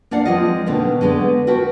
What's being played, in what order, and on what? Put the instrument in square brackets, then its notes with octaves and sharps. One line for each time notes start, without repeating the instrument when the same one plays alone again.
[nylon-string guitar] A#3 D4 D5 F5 F#5
F3 G#3 C4 F4 D#5
B2 D3 D#3 A#3 B3
D3 G#3 A3 B3
F#4 A#4 B4 G5 A5